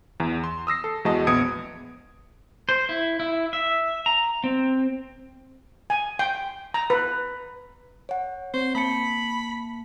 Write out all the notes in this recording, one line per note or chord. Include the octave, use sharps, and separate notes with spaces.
E2
C6
D#6 E6 A#6 C7
A4
E2 G#3 F#4 D#5 A5
A#1 B3 D#6 G#6 C#7 D7
C5
E4
E4
E5
A#5
C4
G#5
G5
A#5
B4
C#5 F#5
C4 C5
A#3 A5 B5 C#7